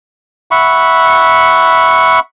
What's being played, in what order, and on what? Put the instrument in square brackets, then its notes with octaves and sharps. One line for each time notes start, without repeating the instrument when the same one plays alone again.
[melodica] E5 F#5 B5 C#6